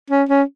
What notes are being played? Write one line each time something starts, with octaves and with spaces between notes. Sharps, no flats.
C#4
C#4